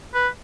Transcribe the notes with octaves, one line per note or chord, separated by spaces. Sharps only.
B4